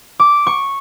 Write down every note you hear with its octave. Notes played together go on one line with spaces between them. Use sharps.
D6
C#6